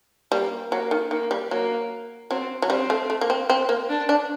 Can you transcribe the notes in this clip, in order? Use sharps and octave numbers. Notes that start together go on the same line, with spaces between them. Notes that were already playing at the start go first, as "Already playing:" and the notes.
G3 A#3
F#3 A#3
D#3
D#3 A#3
G3
F#3 A#3
F#3 C4
F#3
G3 C4
A3
A3
A#3
C4
C4
A#3
D4
D4